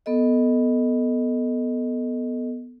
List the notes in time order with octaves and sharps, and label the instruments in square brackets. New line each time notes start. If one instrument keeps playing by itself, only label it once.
[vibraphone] B3 A4 D#5